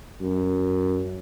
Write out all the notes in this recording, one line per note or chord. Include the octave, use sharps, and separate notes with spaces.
F#2